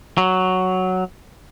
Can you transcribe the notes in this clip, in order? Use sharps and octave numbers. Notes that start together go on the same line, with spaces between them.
F#3